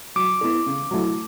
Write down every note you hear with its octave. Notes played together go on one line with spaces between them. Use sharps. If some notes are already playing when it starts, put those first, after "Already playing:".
F#3 D6
B3 E4 A4
C#3
F#3 A3 E4